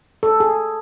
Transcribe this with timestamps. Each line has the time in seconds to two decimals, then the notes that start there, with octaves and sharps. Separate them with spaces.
0.23 A4
0.40 G#4